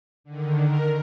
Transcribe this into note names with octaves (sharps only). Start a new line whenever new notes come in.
D3 D#3
A#4